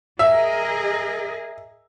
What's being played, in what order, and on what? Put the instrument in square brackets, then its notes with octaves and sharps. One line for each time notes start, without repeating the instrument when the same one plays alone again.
[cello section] G#4 A#4 D#5 [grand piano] E5